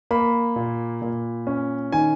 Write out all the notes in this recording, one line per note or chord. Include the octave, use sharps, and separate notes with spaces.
A#3 B5
A#2
A#2
C#4
D#3 G#5